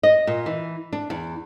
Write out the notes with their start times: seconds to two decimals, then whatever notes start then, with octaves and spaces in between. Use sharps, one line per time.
0.03 D#5
0.27 A#2
0.46 E3
0.93 D4
1.10 E2